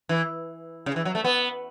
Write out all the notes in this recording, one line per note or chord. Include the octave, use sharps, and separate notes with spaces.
E3
C#3
E3
F#3
A3
B3